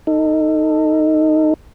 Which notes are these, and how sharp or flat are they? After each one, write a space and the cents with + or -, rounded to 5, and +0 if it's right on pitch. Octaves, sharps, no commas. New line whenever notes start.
D#4 +0 A4 +20